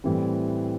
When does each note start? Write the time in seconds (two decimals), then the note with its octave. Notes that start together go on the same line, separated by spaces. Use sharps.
0.04 A2 E3 G3 C4